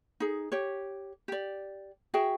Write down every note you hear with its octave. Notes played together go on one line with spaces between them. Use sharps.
D#4 G#4
G4 C#5
G4 D5
F#4 G#4 E5 G5